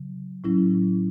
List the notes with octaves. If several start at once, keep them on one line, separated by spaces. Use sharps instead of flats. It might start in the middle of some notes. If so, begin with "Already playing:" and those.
Already playing: C#3 F#3
A2 F#3 C#4 E4